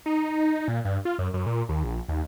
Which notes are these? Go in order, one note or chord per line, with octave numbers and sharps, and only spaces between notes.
D#4
A#2
G2
F4
F#2
F#2
A#2
D#2
A#1
D#2